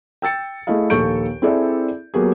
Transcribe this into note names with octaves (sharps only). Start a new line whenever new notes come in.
G5 E6 A6 C#7
A3 E4 G#4 D#5 F5
A#1 D#2 A4 C#6 G6 D7
C4 E4 G#4 A4 D5 E5
F#3 A#3 B3 G4 G#4